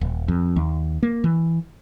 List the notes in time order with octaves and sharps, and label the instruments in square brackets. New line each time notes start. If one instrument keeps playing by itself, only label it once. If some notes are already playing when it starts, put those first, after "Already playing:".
[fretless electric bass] D#1
F2
D#2
A#3
E3